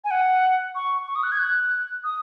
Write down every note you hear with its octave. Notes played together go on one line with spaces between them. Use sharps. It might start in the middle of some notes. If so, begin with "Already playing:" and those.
G#5
F#5
C#6
C#6
D#6
F#6
G#6
F#6
D#6